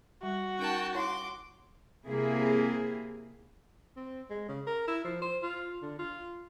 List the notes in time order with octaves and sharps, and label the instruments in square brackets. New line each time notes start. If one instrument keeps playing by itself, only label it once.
[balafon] G3 [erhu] F#4
[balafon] C#4 D#4 A#4 [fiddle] G5 A5
[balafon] E4 C#5 F5 [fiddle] C6 D6
[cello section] C3 A#3 C4 E4 G#4
[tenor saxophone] C4
G#3
C#3
A#4
E4
F3
C5
F4
D3
F4